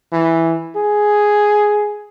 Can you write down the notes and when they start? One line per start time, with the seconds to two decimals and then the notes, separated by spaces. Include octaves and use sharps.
0.12 E3
0.76 G#4